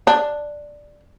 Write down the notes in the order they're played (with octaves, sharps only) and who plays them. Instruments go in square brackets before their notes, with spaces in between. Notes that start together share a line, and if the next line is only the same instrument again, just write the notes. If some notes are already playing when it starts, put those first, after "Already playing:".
[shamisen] D4